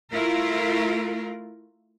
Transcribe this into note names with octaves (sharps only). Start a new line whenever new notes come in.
A3 E4 F4 A#4